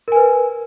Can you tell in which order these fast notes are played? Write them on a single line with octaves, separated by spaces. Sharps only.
A#4 G#5 B4